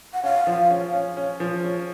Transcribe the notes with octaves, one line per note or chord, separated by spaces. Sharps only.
F#5
C#4 F5
F3
C#4
C#4
C#4
F3
C#4